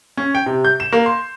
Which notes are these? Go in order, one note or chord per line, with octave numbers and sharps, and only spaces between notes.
C#4
G5
C3
G6
E7
A#3
C6